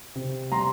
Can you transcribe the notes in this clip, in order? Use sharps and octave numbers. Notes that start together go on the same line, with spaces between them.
C3
G3 A#5 C6